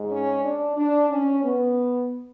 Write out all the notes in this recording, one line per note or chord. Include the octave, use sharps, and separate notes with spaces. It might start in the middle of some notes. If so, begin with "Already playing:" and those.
Already playing: G#2 G#3
C#4
D4
D4
C#4
B3